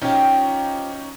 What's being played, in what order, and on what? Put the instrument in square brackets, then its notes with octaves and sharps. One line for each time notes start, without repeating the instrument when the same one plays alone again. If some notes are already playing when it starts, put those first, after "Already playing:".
[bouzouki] F3 G4 [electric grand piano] C#4 D#4